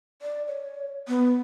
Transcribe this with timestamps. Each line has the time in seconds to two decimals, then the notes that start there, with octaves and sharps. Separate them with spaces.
0.22 D5
0.47 C#5
1.08 B3